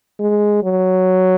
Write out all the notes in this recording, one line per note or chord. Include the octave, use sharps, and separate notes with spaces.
G#3
F#3